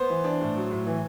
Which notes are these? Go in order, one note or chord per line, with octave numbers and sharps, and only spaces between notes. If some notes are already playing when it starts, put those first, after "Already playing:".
Already playing: B3 C5
E3
D4
A2
F#3
A2
E3